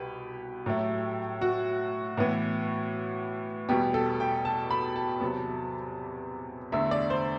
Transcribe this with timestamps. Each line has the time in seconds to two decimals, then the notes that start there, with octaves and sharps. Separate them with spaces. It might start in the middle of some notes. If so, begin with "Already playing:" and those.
Already playing: C2 B2 G4 B4
0.66 A2 F#3 A3
1.41 F#4
2.17 A2 E3 B3
3.69 E2 B2 G3 B3 G4
3.94 A4
4.20 G5
4.45 A5
4.71 B5
4.96 A5
5.21 E2 C3 F#3 B3
6.72 E2 D3 A3 E5
6.91 D5
7.10 C5